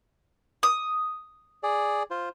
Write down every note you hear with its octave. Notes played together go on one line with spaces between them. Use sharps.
D#6
G#4 D5
F4 C5